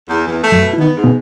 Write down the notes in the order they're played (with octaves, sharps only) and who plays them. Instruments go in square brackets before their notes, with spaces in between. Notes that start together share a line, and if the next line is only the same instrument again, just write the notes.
[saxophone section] E2
E2
A3
[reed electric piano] F#2 F#3
[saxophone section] B2
[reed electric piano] E4
[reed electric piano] D#3 D#4 [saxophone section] B3
[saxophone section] G#2
[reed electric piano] B2 B3